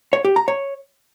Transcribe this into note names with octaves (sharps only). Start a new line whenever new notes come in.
C#5
G4
A#5
C#5